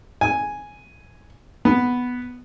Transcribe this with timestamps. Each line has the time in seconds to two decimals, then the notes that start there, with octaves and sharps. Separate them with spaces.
0.21 G#5
1.65 B3